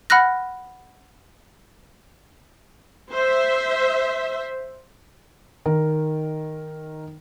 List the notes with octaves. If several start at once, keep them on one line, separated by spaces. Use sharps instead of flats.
F#5 B5 F6 F#6 A#6
C5 E5
D#3 A#4